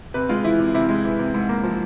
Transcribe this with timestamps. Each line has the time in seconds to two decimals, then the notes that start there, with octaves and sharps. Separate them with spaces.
0.14 C3 B4
0.29 G#3 F4
0.44 E3 E4
0.59 C3
0.74 C3 E4
0.89 G#3
1.04 E3
1.19 C3
1.34 G#2
1.49 A#3
1.63 F3